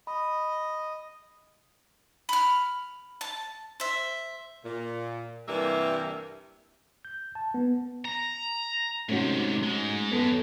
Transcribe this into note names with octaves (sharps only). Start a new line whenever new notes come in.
D#5 B5
B5 F6
A5
C5 E5
A#2
G2 C3 E3 G3 A#3 E5
G6
A5
B3
A#5
G#2 C3 A3 C#4 F#4
G#2 G#3
F#2 B3 A4